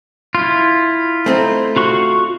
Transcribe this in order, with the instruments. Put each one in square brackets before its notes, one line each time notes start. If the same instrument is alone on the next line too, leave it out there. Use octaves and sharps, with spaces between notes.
[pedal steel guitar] E4 F4
[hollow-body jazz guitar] A3 C4 D#4
[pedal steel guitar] F4 F#4 C#6